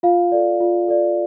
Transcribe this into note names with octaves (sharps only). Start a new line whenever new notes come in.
F4 F5
A4 D5
F4
A4 D5